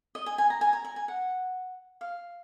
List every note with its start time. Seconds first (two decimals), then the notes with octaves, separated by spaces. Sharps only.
0.15 D#5
0.26 G#5
0.38 G#5
0.50 A#5
0.61 G#5
0.73 A#5
0.84 G#5
0.96 G#5
1.08 F#5
2.01 F5